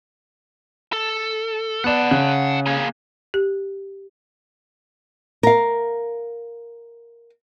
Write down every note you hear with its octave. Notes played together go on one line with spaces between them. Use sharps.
A4
B3 D5 F#5 A5
C#3 F#6
A#3 G#4
G4
A#4 F5